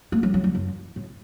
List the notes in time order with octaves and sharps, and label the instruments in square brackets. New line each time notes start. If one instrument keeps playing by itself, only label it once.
[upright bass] A3
F#3
F#3
E2
F#2
A2